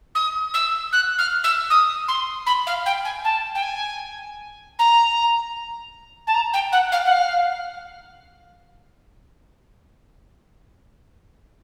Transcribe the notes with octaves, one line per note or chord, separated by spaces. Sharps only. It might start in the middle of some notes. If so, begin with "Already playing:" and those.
D#6
E6
F#6
F6
E6
D#6
C6
B5
F5
G5
G#5
A5
G5
G#5
A#5
A5
A#5
G5
F#5
F5
F#5
F5